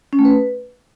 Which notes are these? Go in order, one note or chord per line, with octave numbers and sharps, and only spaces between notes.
C#4
A3
B4